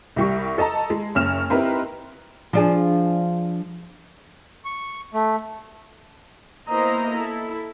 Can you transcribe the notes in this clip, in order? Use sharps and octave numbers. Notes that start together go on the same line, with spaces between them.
C2 G3 C#6
A4 D#5 A5 A#5
G#3
F#1 C#4 F6 E7
C4 D#4 E4 G4 A#4 B4
F3 D4 G#4
C#6
A3
A#3 B3 E4 C5 D#5 A#5
E4 A4